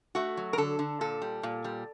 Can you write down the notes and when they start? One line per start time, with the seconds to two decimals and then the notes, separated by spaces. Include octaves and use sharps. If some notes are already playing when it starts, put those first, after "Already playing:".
0.15 A3 F#4
0.37 F#3
0.53 A#4
0.58 D3 A4
0.79 D3
1.01 A#2 A4
1.22 G3
1.43 A#2
1.64 G3